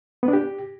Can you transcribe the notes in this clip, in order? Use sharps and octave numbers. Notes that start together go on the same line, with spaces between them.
B3
D4
G4